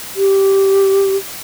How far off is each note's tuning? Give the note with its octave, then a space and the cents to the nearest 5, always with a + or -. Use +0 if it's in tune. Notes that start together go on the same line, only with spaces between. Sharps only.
G4 -10